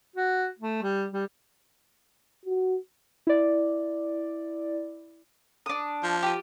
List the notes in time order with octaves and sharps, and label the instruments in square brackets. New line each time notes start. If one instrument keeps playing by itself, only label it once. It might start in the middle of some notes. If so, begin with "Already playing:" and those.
[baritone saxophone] F#4
A3
G3
G3
[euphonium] F#4
[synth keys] E4 D5
[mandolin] D4 D#6
[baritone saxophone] F3
[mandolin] F4 G4